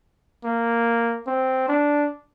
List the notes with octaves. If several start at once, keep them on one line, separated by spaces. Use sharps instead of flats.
A#3
C4
D4